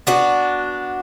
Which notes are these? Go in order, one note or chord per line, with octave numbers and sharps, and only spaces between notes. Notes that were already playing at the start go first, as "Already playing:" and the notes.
B3 D4 F#4